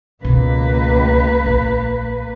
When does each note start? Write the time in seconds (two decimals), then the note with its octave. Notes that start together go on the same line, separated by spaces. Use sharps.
0.24 C#2 B2 D#3 A#3 B4
1.46 A#1